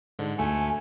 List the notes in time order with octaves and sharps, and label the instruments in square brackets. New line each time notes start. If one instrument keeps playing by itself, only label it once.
[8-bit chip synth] G#2 D3
[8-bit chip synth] D2 A3 C#7 [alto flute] G#5